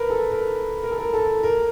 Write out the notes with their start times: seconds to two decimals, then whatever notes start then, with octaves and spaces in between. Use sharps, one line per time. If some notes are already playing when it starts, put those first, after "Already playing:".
Already playing: A#4 B4
0.10 A4
0.32 A#4
0.83 A#4
0.91 A4
0.98 A#4
1.14 A4
1.43 A#4